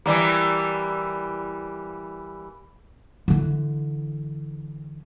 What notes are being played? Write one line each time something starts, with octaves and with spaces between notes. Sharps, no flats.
E3 G3 A#3
D3 E3